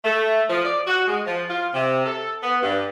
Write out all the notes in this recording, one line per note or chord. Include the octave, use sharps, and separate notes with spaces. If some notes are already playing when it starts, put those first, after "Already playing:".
A3
F3
D5
F#4
G#3
F3
F4
C3
A4
B3
G2